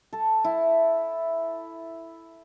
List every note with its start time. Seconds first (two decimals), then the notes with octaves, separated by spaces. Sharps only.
0.13 A4
0.44 E4